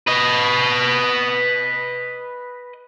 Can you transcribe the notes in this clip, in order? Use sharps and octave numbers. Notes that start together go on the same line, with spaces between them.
B4 D#5